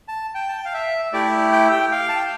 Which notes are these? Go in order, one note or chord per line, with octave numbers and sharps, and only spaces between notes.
A5
G5
A5
G5
F5
E5
A3 E4 G4 D5
G5
G5
F5
A5
G5